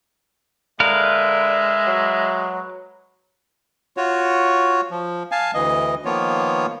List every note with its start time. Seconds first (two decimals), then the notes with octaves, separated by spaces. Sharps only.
0.80 D3 G#3 A#4 B4 E5 F5
1.87 F#3
3.97 F4 F#4 C#5
4.91 F3
5.32 F5 G#5 A5
5.54 D2 E3 D#5
6.05 D#3 F3 A#3 B3 F4 C#5